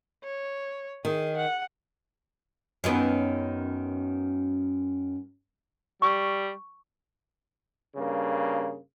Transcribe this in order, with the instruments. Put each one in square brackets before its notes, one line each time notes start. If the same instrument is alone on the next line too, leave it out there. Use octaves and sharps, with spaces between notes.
[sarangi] C#5
[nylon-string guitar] D#3 [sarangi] G#4
[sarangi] F#5
[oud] F#2 D#3 B3
[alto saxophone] G3 [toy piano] C#6
[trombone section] G2 C#3 A#3